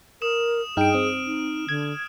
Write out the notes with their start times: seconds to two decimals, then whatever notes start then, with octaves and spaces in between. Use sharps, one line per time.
0.22 A#4 D#6 E7
0.77 G2 D#4 G#4 G5 F6 D7
0.94 C4
1.26 D#4
1.69 D3 G#6